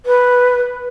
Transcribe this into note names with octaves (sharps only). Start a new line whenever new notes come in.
B4